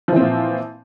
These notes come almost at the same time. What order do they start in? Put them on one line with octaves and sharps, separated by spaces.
F3 E3 C4 A#2